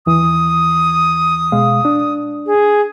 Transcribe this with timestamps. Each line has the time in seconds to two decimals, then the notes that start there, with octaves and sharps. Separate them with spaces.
0.06 D#2 E3 D#6
1.52 B2 G#3 F5
1.85 D4
2.46 G#4